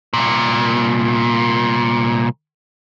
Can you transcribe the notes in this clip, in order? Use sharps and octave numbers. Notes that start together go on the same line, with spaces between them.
C2 A#2